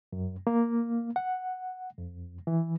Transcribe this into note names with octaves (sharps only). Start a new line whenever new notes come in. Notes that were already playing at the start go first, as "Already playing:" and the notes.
F#2
A#3
F#5
F2
E3